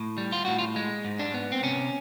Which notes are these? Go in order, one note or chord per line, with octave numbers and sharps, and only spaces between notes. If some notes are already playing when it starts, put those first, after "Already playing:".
Already playing: A2
G3
F4
A2 F#4
F4
G#3
G#2
D4
B3
C4
C3 C#4